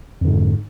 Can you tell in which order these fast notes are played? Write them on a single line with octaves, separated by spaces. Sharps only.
F2 D3 G#2